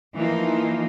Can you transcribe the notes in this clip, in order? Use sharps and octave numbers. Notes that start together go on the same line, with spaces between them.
E3 F3 A#3 D#4 F4